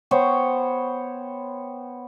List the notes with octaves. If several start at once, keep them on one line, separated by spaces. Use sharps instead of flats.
B3 C5 C#5 G5